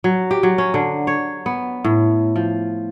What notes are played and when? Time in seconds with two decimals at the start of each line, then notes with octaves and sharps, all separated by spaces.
0.04 F#3
0.31 G4
0.43 F#3
0.58 C#4
0.74 D3
1.07 C#5
1.46 B3
1.84 A2
2.36 F3